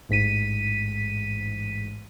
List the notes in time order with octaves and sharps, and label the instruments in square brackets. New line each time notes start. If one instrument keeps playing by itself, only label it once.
[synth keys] A1 G#2 B6 D#7